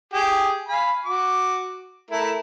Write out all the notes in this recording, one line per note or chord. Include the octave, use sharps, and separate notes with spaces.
G4 G#4
F5 G#5 B5
F#4 D6
A3 E4 A#4